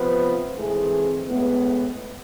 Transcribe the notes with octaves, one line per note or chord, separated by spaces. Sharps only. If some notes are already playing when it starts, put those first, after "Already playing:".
Already playing: C3 F3 B3 F4 B4
G#2 E3 A3 C4 G#4
A2 G#3 B3